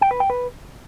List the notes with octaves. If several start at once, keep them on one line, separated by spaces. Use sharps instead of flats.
G5
B4
G5
B4